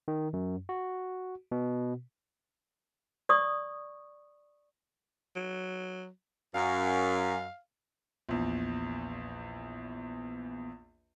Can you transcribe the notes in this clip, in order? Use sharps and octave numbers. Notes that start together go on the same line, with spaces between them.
D#3
F#2
F#4
B2
D5 C#6 D#6
F#3
F#2 F5
A#1 E2